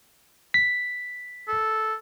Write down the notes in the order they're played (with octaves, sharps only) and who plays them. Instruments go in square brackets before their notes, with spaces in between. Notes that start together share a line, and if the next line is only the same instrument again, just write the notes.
[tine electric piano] B6
[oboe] A4